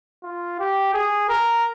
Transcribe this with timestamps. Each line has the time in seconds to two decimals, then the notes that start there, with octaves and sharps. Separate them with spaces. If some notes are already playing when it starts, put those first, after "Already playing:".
0.23 F4
0.60 G4
0.94 G#4
1.29 A#4